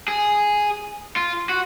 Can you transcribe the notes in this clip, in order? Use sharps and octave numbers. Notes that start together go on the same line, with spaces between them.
G#4
F4
F#4